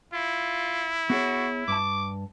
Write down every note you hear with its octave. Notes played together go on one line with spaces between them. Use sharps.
E4 F4
B3 F#4 G#4 C#5
G2 A5 D6